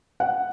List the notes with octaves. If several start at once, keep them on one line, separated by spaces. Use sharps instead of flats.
F#5